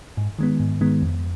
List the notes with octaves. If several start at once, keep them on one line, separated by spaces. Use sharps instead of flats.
G#2
D#3 G#3 B3
G#2
D#3 G#3 B3
F2